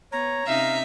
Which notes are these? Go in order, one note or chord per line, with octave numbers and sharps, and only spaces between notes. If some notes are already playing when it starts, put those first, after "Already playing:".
B3 C#5 A#5
C3 C#4 D#4 E5 F5